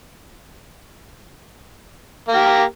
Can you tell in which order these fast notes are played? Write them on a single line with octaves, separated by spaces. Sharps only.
A#3 A#4 G4